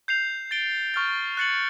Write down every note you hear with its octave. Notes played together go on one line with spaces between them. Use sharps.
G6 C7 F7
A6 D7 G7
C#6 F6 A6
F#6 A6 C#7 F#7